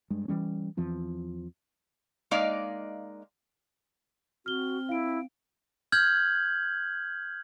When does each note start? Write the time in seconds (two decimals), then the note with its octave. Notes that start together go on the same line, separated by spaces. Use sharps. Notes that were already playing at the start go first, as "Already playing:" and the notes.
0.10 G2 G#3
0.28 E3 F3 G3 C#4
0.77 E2 E3 F3 C4
2.31 G#3 A#3 D#4 D5 F5
4.46 C4 F#4 F6 G7
4.89 E4 F5 D7
5.92 F6 G6 G#6 F#7